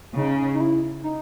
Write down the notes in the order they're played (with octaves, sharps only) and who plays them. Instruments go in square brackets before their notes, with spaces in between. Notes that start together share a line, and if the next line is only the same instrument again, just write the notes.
[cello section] C#3 [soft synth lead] D#4
[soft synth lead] D#4
E4
D#4